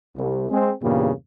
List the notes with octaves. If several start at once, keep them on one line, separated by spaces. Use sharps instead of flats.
C2
G#3 C4 G#4
E2 G2 A#2 C#3 G3 A#3